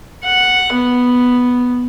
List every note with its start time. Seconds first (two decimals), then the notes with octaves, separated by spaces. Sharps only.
0.24 F#5
0.72 B3